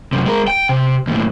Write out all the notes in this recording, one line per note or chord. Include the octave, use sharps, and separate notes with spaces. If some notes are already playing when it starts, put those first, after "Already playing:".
F#2 C3
G#3 A#4
G5
C3
D#2 A2